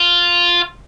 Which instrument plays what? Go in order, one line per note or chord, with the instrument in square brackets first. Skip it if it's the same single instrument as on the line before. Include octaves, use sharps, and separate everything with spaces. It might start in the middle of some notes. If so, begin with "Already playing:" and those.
Already playing: [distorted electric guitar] F4